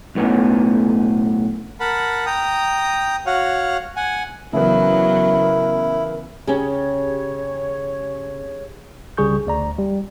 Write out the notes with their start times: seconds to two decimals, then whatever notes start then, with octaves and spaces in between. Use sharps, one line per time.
0.15 B1 A2 B3 C#4
1.80 A#4 F#5 A5 B5
2.26 G5 A#5 D#6
3.26 F#4 C#5 F5 F#5
3.96 F#5 G#5
4.53 C#3 E3 F#3 B3 E4 A#4
6.47 C#3 C#4 G4 G#4 C#5
9.17 C2 C#3 G3 G#4 C#6 G6
9.47 D2 D5 A#5
9.79 G3